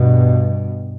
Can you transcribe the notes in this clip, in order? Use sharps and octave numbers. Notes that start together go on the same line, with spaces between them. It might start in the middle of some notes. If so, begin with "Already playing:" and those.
Already playing: G2 B2